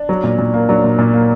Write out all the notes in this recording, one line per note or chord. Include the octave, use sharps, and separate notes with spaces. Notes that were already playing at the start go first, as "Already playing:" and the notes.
Already playing: D4
F#3
A#2
A#2
A#3
F#3 D4
A#2
A#2
A#3